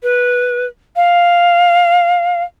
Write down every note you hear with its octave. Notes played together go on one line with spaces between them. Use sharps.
B4
F5